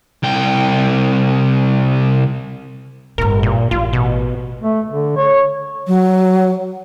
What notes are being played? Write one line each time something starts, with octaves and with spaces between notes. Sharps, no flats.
C2 G5
G1 A2 A#4
A#2
A1 F4
B2
A3
D3
C#5
F#3